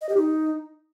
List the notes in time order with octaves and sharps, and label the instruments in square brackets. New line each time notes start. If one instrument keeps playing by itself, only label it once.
[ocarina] D#5
G4
D#4